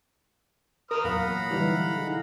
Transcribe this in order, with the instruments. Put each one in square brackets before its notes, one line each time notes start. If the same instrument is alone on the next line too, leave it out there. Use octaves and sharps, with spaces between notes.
[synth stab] A#4 [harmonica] B4 D#6 F6
[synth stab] E2 [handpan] A#2 F#3 [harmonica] F5 [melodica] F#5 A#5 B5
[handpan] D3 D#4 E4 [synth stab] E3 G3
[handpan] D#4 E4 G#4